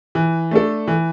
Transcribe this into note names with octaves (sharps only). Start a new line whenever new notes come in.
E3
A3 D4 A4
E3